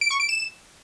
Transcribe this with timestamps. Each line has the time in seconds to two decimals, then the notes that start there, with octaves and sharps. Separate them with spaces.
0.01 D7
0.11 C#6
0.20 D7
0.29 E7